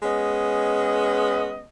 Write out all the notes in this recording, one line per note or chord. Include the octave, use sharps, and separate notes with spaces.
G#3 B3 C#4 D#5